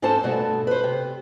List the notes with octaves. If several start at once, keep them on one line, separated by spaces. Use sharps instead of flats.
G#2 C4 F4 A4 C5 A5
G2 B2 A3
B4 C5
C3